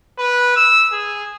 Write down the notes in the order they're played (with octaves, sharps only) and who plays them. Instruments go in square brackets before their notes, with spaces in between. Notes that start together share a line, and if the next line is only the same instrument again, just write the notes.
[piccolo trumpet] B4
E6
G#4